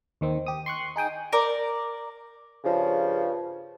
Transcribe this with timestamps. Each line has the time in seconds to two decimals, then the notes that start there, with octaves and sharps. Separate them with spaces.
0.21 D#2 D#3 C4
0.46 G4 D#6
0.66 C6 C#6 F#6
0.96 D#4 G#4 G5 D#6
1.33 A#4 D5
2.64 G2 C#3 F3